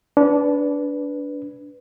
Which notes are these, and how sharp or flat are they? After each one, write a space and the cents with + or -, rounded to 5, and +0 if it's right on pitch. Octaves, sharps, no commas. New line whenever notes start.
D4 -20 B4 +0